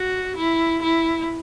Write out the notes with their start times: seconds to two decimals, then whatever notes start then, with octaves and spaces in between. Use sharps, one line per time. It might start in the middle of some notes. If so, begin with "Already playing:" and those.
Already playing: F#4
0.37 E4
0.83 E4